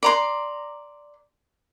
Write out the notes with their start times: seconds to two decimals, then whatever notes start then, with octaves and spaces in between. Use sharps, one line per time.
0.03 D5 A#5 C6